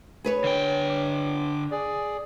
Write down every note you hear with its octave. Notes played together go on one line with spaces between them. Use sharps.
G#4 B4 C#5
D3 G5
D6
G#4 D5